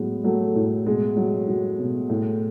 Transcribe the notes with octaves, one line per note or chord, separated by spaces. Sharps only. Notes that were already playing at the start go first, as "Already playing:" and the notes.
Already playing: A2 F#3 G#3 B3
F#3 A3
A2
B2 G#3
F#3
F#3
B2
A2